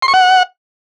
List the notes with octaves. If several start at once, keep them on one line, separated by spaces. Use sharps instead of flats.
C6
C#6
F#5